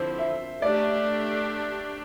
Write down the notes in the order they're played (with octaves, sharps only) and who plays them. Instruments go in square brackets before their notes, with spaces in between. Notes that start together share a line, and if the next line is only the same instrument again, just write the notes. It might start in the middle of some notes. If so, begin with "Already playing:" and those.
Already playing: [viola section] D3 F3 C4 E4 [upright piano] C5
[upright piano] E5
[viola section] A3 D4 G4 [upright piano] D5